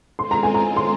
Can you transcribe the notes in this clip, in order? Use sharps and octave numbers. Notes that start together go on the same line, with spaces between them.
G#3 C4 F4 C6
A#5
G#5
A#5
C6